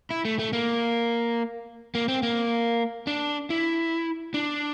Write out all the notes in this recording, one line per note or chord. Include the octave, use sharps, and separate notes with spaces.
E4
A3
A3
A#3
A#3
C4
A#3
D4
E4
D4